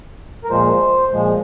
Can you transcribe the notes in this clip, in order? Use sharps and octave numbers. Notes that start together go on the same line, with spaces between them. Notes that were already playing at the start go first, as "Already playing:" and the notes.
A#4
A#2 F3 G#3 C5
A#2 F3 G#3